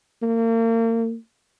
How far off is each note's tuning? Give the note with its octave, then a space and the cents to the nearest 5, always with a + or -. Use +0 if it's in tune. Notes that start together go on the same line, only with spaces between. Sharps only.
A#3 -35